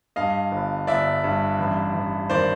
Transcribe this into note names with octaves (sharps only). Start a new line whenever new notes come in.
G2 D#5 F5
G1
G1 D5 E5
G2
A1
A1
D#3 C5 D5